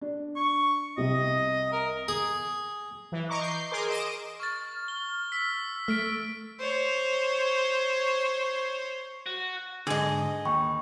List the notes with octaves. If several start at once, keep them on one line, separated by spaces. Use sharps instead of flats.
D4
C#6
C2 C3 D#5
A#4
G#4
E3
D#5 A#5 C#6 D6
G6 C7
G#4 A#4 C6 D6
D#5 D6 D7 E7
C#6 F6 A6
G7
E6 B6
A3 E6 F6 B6 D7
C5 C#5
F#4
G#2 D3 G#4 D#5
D#2 G5 B5 C#6